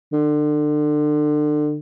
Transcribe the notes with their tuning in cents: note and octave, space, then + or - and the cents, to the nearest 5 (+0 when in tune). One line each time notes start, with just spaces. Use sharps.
D3 +30